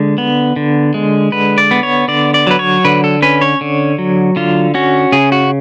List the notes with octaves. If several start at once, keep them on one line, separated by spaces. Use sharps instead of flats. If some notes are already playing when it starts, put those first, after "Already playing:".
Already playing: D3 G#3
B3
D3
G#3
D3 B4
D5
B3
C#5
D3 D5
D5
F#3 B4
C#5
D3 B4
A4
C#4 B4
C#5
D3
F#3
D3 F4
C#4 F#4
C#3 G#4
F#4